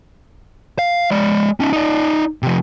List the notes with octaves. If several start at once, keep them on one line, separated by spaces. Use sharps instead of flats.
F5
G#3 D5
C#4 D#4
D#4 D5
C3 F3